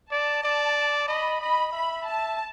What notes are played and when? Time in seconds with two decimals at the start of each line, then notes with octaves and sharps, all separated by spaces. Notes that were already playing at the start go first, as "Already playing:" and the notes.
0.11 D5 A5
0.44 D5
1.08 D#5 B5
1.41 D#5 B5
1.72 E5 B5
2.05 A5